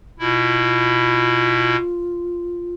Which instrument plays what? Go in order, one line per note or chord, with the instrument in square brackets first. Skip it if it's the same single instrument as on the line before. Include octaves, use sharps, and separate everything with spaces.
[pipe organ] B2 E4 [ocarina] F4